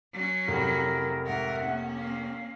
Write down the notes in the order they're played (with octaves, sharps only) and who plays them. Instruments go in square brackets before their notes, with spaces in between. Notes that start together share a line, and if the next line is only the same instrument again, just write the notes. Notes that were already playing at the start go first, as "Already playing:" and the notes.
[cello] F#3 C#4
[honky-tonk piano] F1 [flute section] E4 A#4
[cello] G#2 A#4 [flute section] E5 F#5
[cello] A#3 C#4
[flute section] F5